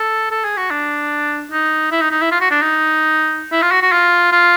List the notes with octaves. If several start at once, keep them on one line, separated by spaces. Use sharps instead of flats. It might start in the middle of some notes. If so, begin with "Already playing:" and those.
Already playing: A4
A4
G#4
F#4
D4
D#4
E4
D#4
D#4
E4
F4
F#4
D4
D#4
E4
F4
F#4
F#4
F4
F4